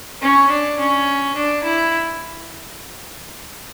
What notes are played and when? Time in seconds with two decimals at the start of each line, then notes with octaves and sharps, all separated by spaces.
0.22 C#4
0.50 D4
0.79 C#4
1.36 D4
1.64 E4